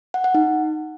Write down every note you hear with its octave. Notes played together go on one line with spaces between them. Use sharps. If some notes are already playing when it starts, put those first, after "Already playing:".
F#5
F#5
D#4